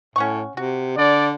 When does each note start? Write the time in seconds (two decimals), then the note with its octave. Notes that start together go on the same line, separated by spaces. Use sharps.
0.16 A2 C#4 F#5 C#6
0.57 C3 F#4
0.97 D3 D5